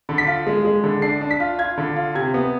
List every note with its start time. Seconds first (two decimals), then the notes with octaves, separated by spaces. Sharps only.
0.09 D3
0.18 B6
0.27 F4
0.47 G#3
0.65 G#3
0.84 D3
1.02 D4 C7
1.21 D4
1.31 B6
1.40 F4
1.59 F4 G#6
1.77 D3
1.96 F4
2.15 C3 G#6
2.34 B3